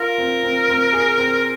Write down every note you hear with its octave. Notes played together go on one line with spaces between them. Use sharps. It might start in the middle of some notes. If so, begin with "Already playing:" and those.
Already playing: F4 A#4
C4
C4
C4
G#4
C4